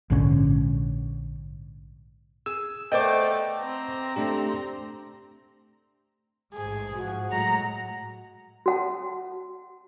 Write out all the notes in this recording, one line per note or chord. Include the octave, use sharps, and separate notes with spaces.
A#1 G#2 D3 C#4
G#4 E6
A3 B3 C5 D5 D#5 G5 D6
C4 A#5
A3 D4 G4
A1 G#2 G#4
G#2 F3 F#4
A2 F#3 G#3 F#5 A#5
F#4 F#5 A5